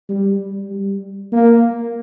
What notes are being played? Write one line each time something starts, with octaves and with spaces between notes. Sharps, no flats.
G3
G3
A#3